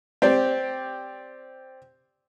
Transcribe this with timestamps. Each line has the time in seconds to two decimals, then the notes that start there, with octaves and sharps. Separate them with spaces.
0.22 C4 G4 D5